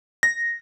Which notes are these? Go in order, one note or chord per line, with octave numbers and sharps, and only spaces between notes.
A#6